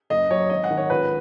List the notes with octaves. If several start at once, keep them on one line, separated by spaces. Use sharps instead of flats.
F#1 D#5
F#3 C#5
G#1 D#5
F#5
D#3
C#5
C#2 B4